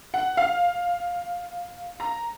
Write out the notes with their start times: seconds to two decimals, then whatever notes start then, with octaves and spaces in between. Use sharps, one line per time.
0.14 F#5
0.37 F5
2.00 A#5